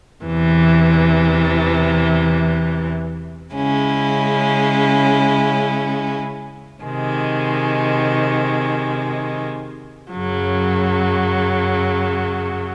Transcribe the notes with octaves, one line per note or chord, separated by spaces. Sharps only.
E2 C3 E3
C#3 G#3 C#4 E4
C3 D#3 G#3
F#2 C#3 F#3